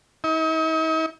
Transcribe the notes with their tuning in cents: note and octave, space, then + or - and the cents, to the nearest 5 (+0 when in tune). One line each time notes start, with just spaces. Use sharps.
D#4 +45